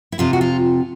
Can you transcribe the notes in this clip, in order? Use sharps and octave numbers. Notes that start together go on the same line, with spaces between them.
E4
F2 C3 F3 F4
F#4
F4